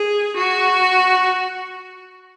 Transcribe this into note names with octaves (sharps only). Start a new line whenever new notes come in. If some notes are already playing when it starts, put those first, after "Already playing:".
Already playing: G#4
F#4